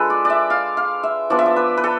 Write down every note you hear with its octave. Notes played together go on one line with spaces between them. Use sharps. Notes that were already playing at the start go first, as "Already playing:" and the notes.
Already playing: G#3 D4 F4 A4 B4
D5
D5 E5
F5
F5
E5
F3 B3 D4 D5
E5
D5
B4
B4
A4